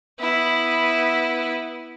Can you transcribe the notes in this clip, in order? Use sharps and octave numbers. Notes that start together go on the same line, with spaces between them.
B3 E4